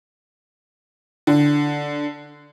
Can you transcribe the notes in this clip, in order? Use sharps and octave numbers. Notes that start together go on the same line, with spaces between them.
D3